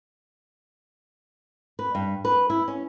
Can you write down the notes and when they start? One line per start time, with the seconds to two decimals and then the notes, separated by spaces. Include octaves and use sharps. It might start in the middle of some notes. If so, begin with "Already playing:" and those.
1.79 B4
1.95 G2
2.25 B4
2.50 E4
2.68 C#4